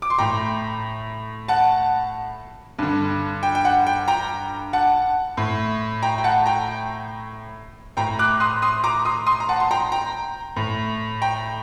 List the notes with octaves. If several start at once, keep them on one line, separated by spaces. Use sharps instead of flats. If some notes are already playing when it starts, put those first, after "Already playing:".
D6
C6
A2 G5 A#5
F#5 A5
G2 D3
G5
G5
F#5
G5
G5 A#5
F#5 A5
A2
G5 A#5
G5
F#5 A5
G5 A#5
A2 G5 A#5
D6 F#6
C6 D#6
C6 D#6
A#5 D6
C6 D#6
C6 D#6
A#5
F#5 A5
C6
G5 A#5
G5 A#5
A2
G5 A#5